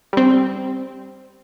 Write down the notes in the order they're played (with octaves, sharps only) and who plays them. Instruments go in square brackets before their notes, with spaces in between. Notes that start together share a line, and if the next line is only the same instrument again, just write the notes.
[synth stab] G3 C4